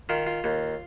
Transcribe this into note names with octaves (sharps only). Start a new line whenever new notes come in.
D#3 F4
F4
D#2